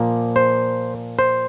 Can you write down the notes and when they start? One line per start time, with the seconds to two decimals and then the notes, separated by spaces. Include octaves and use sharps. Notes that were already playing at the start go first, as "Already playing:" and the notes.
Already playing: A#2 F3 A#3
0.36 C5
1.19 C5